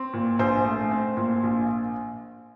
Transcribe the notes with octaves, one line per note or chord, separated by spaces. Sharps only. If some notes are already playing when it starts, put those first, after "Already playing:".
Already playing: C4
A#2
A#1 C5
A3
C4
A#2
A#1